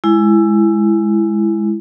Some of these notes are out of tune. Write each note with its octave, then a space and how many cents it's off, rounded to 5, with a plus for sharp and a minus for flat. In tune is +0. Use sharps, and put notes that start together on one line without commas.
G#3 +0 E4 +15